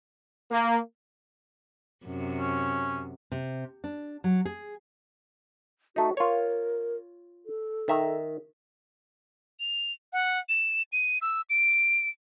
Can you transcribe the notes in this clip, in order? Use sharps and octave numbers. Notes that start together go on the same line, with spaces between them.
A#3
F#2 C3
C#4
C3
D4
F#3
G#4
A3 D#4 F#4
F4 A#4 C#5
A4
D#3 E5 A#5
F7
F#5
E7
D#7
E6
D7